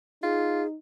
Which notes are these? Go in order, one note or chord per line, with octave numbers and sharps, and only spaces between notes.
D#4 F4 G#4